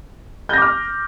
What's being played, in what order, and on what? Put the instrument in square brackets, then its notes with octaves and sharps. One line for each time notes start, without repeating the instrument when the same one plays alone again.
[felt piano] G6
A#6
D6
F6